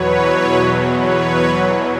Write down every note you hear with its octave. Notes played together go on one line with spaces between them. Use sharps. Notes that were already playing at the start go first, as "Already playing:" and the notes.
Already playing: E2 B2 F#3 B4 C#5
B4 C#5